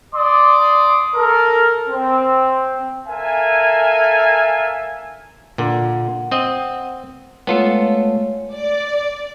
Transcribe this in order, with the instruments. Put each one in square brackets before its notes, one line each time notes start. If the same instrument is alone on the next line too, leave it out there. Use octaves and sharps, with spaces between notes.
[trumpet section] D5 C6 D6 D#6
A4 A#4
C4
[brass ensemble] A4 A#4 E5 F5 G#5
[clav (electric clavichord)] A#2 D3 [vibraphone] F#5
[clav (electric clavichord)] C4 D#5
[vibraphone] G#3 A3 C#5 [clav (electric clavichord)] B3 F4 A4
[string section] D5